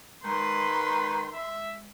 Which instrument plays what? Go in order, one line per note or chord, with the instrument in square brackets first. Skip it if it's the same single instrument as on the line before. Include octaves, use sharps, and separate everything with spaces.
[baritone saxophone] D#3 [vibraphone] G#3 [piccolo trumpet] B4 [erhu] C6
[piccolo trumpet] E5